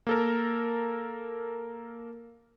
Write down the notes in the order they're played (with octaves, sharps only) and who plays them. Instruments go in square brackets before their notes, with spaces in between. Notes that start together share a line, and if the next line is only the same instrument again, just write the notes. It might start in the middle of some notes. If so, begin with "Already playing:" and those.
[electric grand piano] A#3 A4 A#4